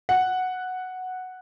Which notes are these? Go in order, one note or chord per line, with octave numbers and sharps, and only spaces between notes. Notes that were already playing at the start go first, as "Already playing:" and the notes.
F#5